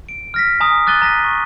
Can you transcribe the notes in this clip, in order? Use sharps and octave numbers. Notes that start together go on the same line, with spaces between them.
D7
F6 A#6 B6
G#5 A#5 D#6
D6 F#6 A6 D#7 G7
A#5 A#6 B6 D#7
C#6